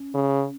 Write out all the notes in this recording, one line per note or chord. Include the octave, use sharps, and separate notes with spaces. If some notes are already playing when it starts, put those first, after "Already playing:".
Already playing: C#4
C#3